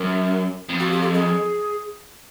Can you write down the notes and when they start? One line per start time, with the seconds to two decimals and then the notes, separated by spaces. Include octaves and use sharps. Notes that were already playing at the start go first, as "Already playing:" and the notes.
Already playing: F#2 A#4
0.69 F2
0.80 F#4
0.92 G4
1.02 A4
1.14 G#4